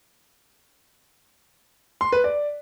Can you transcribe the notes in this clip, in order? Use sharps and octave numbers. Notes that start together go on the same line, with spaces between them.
C6
B4
D5